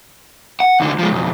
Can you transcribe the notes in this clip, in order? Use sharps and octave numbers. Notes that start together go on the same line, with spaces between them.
F#5
D#2 D3
F3 G#3
B1 F2